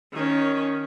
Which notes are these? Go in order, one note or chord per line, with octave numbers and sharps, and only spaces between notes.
D#3 C#4